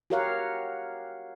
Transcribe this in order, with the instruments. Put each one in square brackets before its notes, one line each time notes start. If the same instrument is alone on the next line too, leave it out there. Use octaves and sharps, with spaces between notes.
[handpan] F#4 G4 A#4 C#5 F5 F#5